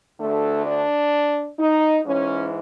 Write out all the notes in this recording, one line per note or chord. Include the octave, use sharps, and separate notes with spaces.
D2 D3 A3
D4
D#4
G#2 E3 C#4